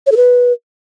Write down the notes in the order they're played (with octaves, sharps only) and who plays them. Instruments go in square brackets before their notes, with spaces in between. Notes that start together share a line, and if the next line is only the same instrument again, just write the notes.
[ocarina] C#5
A4
B4